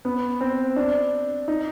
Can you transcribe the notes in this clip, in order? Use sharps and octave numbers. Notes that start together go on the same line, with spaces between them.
B3
C4
D4
D#4